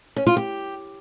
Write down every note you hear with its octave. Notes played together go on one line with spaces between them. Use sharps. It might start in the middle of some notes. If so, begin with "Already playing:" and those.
C#4
F4
G4